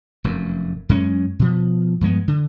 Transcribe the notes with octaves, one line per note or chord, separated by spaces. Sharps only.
F1 F#2
F#2 G#3 C#4
B2 F3
G2 F3 G#3 B3
D3